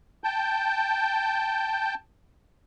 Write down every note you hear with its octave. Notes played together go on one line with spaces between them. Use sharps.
G5 A5 G6